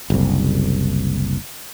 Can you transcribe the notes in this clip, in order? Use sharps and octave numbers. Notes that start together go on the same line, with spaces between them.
F#1 C2